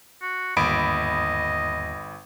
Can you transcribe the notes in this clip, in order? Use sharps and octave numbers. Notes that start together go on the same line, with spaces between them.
F#4
G1 D#2 G#2 D#5 B5 D7